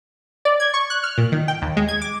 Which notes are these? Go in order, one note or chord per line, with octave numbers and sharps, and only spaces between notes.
D5
G#6
C#6
F#6
F6
A#2
D#3
G5
D#2
G#3
G#6
D6